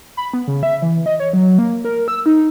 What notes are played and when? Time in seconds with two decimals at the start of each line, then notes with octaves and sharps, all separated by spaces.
0.17 B5
0.33 B3
0.48 C#3
0.63 E5
0.82 E3
1.06 D#5
1.20 C#5
1.33 F#3
1.59 A#3
1.85 A#4
2.08 E6
2.26 D#4